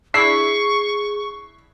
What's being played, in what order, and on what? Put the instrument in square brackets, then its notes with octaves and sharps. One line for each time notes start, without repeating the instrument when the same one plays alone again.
[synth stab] D4 E4 B6 [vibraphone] G#4 [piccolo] C#6 [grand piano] C7